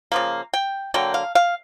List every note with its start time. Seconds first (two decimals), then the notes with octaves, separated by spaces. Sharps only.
0.12 C#3 F3 A#3
0.53 G5
0.94 D3 F#3 A#3 G5
1.14 F5
1.35 F5